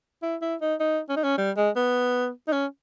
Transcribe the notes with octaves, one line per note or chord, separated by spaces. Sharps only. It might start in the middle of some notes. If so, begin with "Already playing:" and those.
E4
E4
D#4
D#4
C#4
D#4
C#4
G3
G#3
B3
D#4
C#4